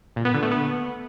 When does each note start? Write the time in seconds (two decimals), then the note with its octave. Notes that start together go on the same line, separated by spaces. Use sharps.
0.16 A#2
0.25 B3
0.34 D3
0.43 A3
0.51 B3